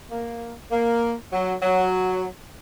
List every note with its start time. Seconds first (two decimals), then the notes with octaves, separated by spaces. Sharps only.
0.11 A#3
0.71 A#3
1.33 F#3
1.62 F#3